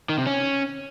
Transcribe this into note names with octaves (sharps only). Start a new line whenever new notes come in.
D#3
C3
C#4